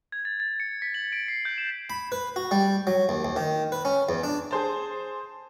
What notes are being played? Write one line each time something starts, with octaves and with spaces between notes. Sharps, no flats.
G#6
A6
A6
C#7
B6
F#7
D7
C7
G6
E7
B5
B4
F#4
G3
F#3
D#2
D#2
D#3
B4
C#4
E2
D4
G#4 C5 A5